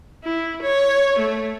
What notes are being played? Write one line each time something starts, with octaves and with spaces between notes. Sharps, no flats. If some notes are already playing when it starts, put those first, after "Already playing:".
E4
C#5
A3